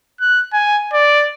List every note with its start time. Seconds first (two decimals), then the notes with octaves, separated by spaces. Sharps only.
0.21 F#6
0.53 G#5
0.93 D5